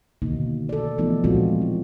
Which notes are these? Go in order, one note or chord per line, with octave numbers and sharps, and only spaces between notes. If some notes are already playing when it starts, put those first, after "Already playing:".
B2 D3 D#3 A#3 D#4
A4 D5
E3 F3 A3 B3 D#4 F4
A#2 F3 G#3 C4 F4 F#4
E4